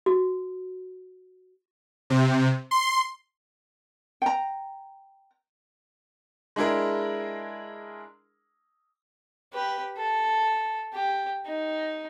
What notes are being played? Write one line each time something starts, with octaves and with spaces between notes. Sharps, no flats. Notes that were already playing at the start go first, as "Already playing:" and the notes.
F#4
C3
C6
G5 A#5
G#3 D4 E4 G#4 A#4
G4 B4
A4
G4
D#4